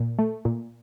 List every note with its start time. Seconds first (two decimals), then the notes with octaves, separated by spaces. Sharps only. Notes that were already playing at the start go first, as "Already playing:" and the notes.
Already playing: A#2
0.19 A3
0.45 A#2